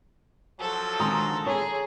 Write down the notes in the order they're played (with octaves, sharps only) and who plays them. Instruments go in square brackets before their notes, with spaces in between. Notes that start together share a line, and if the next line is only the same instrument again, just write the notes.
[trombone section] F3 F#3 C5 [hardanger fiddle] A4
[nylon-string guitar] D3 D#3 G#3 [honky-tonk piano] A#5 C6 D#6
[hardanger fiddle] G#4 [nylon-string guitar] C#5